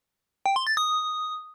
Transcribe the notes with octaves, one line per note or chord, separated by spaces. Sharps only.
G5
C6
A6
D#6